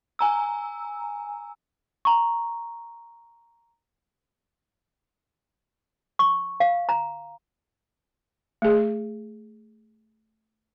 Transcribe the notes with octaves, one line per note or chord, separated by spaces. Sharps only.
G#5 A#5 E6
A#5 C#6
C#6
F5
A#5
A3 G#4